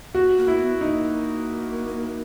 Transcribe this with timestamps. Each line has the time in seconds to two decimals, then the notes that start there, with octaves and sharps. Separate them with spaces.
0.14 A#3 F#4
0.36 A#3
0.47 E4
0.59 B3
0.81 A#3 D#4